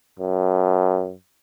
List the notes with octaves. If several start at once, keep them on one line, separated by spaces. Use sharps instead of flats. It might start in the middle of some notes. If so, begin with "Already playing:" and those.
F#2